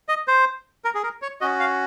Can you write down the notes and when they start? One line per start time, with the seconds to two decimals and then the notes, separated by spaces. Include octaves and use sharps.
0.09 D#5
0.28 C5
0.85 A#4
0.95 G#4
1.03 A#4
1.22 C#5
1.41 C#4 F#4 D#5
1.60 F5